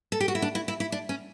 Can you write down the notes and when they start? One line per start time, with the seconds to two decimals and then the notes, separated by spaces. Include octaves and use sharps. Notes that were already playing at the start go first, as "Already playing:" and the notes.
0.12 A4
0.20 G4
0.28 F#4
0.35 E4
0.42 D4
0.55 E4
0.68 E4
0.80 E4
0.92 D4
1.09 C#4